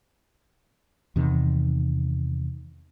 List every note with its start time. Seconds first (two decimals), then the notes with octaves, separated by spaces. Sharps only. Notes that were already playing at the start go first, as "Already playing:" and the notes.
1.16 E2 C3 D#3